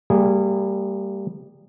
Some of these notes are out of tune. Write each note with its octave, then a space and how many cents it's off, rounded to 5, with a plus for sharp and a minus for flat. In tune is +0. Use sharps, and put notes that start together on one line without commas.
G3 +0 A#3 -40 G#4 -15